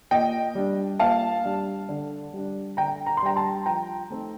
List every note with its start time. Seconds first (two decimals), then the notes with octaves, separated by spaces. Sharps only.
0.11 A#2 D#5 G5
0.55 G3 D4
1.00 A#2 F5 A5
1.44 G3 D4
1.89 D3
2.33 G3 D4
2.77 D3 G5 A#5
3.06 A#5
3.17 C6
3.22 G3 D4 G5 A#5
3.36 A5 C6
3.66 F3 G5 A#5
4.10 A3 C4 D#4